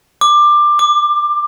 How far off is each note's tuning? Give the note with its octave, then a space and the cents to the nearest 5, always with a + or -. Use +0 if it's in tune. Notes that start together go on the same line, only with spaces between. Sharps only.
D6 +15
D6 +40